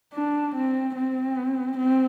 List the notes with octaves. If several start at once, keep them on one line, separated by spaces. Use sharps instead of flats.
D4
C4
C4
C4